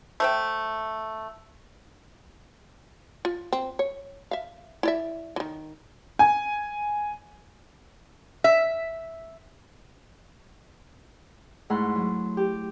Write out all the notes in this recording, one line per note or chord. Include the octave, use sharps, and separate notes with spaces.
A3 C5 G5
F4
C4
C#5
E5 F5
E4 D5 E5
D#3 E3
G#5
E5
G#2 A3 E4 F#5 C6
F#3
G4